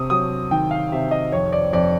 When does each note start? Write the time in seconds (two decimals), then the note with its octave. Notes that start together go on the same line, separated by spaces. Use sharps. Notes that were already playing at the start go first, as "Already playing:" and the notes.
Already playing: C3 D#6
0.10 F#3 D#6
0.51 D#3 G5
0.71 F5
0.92 C3 E5
1.11 D#5
1.32 F2 C#5
1.53 D5
1.73 F2 D5